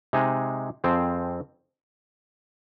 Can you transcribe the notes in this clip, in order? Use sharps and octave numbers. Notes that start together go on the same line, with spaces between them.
C3 G#3 D#4 G#4
F2 F3 C4 G#4 C5